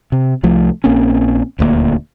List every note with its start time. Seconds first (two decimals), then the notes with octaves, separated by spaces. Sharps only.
0.12 C3
0.43 C2 F3 A3
0.84 A#1 A#3 C4 C#4
1.59 D#1 D2 G#3 A#3